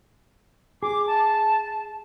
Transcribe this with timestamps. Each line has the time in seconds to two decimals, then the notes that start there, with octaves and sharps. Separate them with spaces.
0.83 G#4 D6
1.07 A5